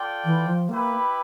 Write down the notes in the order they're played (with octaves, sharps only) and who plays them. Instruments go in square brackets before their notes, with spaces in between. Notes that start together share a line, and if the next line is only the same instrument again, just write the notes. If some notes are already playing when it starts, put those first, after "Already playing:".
Already playing: [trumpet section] F4 A4 D5 G5
[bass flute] E3
F3
[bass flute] A#3 [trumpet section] E4 G4 B4